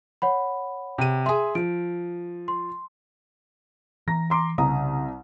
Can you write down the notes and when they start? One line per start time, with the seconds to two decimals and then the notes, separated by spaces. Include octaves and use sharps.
0.22 C#5 F#5 B5
0.98 C3 D#7
1.26 G#4 E5 C6
1.55 F3 D7
2.48 C6
4.08 E3 A#5 A#6
4.30 A#5 C6 D6
4.58 C2 C#3 A#5 D#6